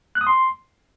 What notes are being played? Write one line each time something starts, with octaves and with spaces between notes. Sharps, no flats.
F#6
D#6
C6